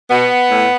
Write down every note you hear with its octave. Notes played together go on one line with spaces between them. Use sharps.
B2 B3
A2